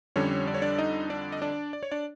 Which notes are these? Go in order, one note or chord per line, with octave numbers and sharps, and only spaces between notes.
F2 D3 G3 C#4 C#5
D5
C#5
D4 D5
D#4 D#5
D4 D5
D#5
D4 D5
D5
C#5
D4 D5